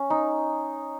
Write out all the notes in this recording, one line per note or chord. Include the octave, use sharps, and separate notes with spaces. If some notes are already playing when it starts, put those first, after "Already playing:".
Already playing: C#4
D#4